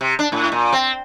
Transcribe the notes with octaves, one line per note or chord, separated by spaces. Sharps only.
C3
D4
A2
A#2
C4